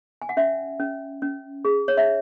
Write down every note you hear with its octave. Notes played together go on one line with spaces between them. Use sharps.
G#5
F#5
C#4 E5
C#4
C#4
G#4
C#5
E5